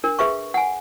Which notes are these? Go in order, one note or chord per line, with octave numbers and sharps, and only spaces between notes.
D4 A#4
G#4 B4 E5 F5 C#6
F#5 G#5